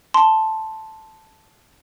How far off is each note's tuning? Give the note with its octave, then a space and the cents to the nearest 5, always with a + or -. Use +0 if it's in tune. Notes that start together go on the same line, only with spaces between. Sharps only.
A5 +0 C6 +0